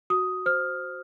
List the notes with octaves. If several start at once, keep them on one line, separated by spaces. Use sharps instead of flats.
F#4 D#6
C5 F6